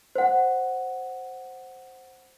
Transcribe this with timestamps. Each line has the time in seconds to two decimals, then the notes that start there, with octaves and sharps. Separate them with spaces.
0.16 C5 F#5